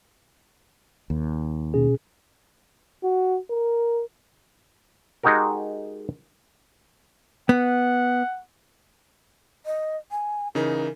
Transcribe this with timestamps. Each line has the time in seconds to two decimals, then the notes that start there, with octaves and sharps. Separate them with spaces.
1.10 D#2
1.74 B2 C#4 G#4
3.03 F#4
3.50 A#4
5.23 G#3 D#4 F#4 G4 A#4
7.49 B3 F#5
9.66 D#5
10.11 G#5
10.55 C#3 E3 D#4 A#4